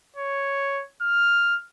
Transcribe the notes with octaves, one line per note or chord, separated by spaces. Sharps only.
C#5
F6